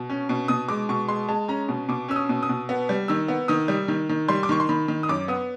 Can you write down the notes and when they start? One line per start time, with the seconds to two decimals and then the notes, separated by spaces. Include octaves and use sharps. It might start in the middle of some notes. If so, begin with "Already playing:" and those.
Already playing: B2
0.10 C#4
0.29 B2
0.48 B2 D#6
0.69 G#3 D6
0.89 B2 C#6
1.08 G#3 C6
1.28 G#3 A5
1.48 C#4 A#5
1.69 B2
1.89 B2 D6
2.08 C#4 E6
2.16 D#6
2.29 B2
2.43 D#6
2.49 B2
2.69 B3
2.89 G3
3.08 D#3 E6
3.28 B3
3.48 D#3 D#6
3.68 G3
3.88 D#3
4.09 D#3
4.28 G3 C6
4.43 D6
4.49 D#3 C#6
4.60 C6
4.69 D#3 B5
4.88 D#3
5.03 D#6
5.09 F#2 D6
5.28 B3 D#6